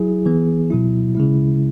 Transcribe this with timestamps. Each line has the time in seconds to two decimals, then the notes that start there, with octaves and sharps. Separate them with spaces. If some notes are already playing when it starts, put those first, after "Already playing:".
Already playing: F#3 E4 G#4
0.25 E3 B3 G#4
0.70 B2 F#3 E4
1.15 C#3 G#3 E4